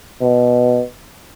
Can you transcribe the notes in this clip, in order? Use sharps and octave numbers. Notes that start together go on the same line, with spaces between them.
B2